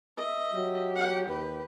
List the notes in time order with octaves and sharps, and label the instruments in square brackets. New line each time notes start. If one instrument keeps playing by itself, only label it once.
[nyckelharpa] D#5 E5
[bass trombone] F#3 [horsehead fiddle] G4
[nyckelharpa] F#5
[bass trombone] D#2 [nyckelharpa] B4